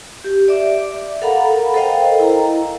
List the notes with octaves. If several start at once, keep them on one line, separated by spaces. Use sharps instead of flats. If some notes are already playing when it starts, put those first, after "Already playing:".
G4
D5 E5 D6
A4 A#4 F5 F#5 A#5 B5
A4 A#4 C5 D#5 F5 G5
E4 A#5